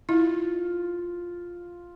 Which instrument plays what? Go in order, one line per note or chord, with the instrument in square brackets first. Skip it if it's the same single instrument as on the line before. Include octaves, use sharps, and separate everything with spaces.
[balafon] E4 [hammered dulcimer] F4